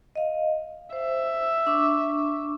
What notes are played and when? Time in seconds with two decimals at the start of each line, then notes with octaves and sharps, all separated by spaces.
0.16 D#5 F5
0.93 C5 E5
1.67 D4 C#6 D6